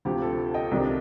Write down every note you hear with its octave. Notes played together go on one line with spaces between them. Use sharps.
D2 C3 F3 G4
A4
D#5 G5
C2 C3 D#3 G3 D4